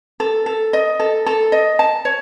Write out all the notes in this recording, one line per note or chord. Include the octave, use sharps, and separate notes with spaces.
A4
A4
D#5
A4
A4
D#5
A5
C#5